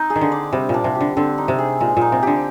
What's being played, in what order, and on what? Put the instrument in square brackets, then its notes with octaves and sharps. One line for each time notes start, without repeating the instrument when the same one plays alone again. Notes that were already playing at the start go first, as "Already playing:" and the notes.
Already playing: [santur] C4 D#4
G#4
[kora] D#3
D3
[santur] D5
[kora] C3 [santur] G3
[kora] A#2 [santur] D4
[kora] C3
[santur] G4
[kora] D3
[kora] D3 [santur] C4
[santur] D#4
[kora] C3
[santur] G#4
[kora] A#2 [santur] G#3
[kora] A#2 [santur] D#4
[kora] C3
[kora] D3 [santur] G4